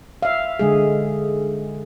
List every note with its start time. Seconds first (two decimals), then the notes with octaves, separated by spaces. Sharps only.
0.22 E5 F5
0.59 D3 G#3 G#4